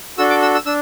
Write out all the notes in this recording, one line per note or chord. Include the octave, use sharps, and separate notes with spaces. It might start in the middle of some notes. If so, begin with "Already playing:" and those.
D4 F#4 A4 E6
D6
E6
E6
D4 E6